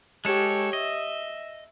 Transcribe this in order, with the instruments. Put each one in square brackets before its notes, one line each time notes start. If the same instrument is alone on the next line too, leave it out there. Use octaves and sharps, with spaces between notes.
[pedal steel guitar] G#3 A4 [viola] G4 C#5
[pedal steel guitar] D#5 [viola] E5